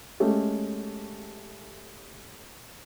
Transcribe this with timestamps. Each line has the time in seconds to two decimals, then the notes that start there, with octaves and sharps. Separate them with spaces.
0.20 G#3 A3 C#4 G4 A4